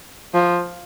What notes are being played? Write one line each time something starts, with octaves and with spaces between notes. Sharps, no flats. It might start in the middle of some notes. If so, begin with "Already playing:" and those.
F3